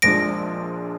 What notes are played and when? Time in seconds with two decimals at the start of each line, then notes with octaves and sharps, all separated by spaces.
0.02 A#1 A#2 F3 G#3 D4 A#6 D7